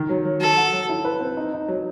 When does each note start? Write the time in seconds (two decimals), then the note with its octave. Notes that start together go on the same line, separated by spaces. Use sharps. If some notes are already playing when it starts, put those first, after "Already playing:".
Already playing: D#3
0.09 F#3
0.25 F#3
0.40 F#3 A4
0.57 F#4
0.73 F#3
0.89 E4
1.05 B4
1.21 C4
1.37 D#4
1.53 D#4
1.68 F#3